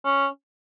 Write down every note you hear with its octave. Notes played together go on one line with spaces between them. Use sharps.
C#4